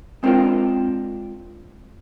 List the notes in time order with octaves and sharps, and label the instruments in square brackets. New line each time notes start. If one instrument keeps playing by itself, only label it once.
[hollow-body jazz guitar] G#3 C4 D4 F4 A#4 G5